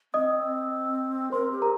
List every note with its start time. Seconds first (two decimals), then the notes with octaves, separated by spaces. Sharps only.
0.14 C4 D#5 D#6
1.32 A#4 C5 C6
1.52 G4
1.62 A#4 A#5